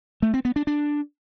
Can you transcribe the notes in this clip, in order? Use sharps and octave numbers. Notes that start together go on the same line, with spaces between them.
A3
C4
B3
D4
D4